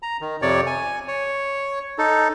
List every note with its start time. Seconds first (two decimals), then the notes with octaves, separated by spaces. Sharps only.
0.03 A#5
0.21 D#3
0.42 F2 C3 C#5 D5
0.66 G#5
1.08 C#5
1.98 D#4 A4